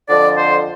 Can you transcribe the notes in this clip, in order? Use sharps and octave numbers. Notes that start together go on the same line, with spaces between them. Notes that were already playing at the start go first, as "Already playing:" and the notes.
F2 D3 F3 D5
C5